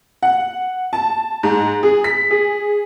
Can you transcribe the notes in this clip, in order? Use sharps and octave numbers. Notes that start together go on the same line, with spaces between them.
F#5
A5
G#2
G#4
B6
G#4